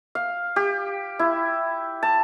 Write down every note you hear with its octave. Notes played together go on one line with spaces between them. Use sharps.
F5
G4
E4
A5